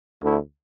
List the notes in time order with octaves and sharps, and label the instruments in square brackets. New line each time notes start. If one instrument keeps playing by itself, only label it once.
[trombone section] D2 D3 A3 E4